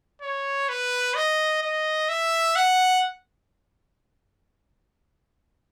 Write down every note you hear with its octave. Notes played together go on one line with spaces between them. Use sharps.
C#5
B4
D#5
D#5
E5
F#5